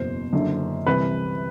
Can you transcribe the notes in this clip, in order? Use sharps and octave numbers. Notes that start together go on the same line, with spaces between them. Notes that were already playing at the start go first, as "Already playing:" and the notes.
Already playing: F#1 E2 B2 C5
F#1 F#2 D3
C2 C3 E3 B4